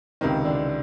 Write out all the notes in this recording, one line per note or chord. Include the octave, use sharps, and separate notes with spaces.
C#2 C3 D#3 C4
D3 D4